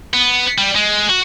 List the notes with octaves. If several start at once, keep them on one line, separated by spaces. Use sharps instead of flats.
B3
G3
G#3
F#4